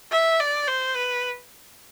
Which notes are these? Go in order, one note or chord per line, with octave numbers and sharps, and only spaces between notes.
E5
D5
C5
B4